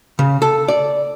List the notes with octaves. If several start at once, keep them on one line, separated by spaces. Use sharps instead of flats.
C#3
A4
D5